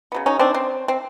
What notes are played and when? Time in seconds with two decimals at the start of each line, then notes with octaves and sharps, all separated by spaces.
0.12 C#3 F#3 B3
0.26 C#4 D#4
0.39 C4 D4
0.54 C4
0.88 C4